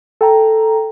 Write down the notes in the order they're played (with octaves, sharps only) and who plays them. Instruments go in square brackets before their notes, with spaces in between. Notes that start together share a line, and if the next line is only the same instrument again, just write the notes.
[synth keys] A4 G5 A#5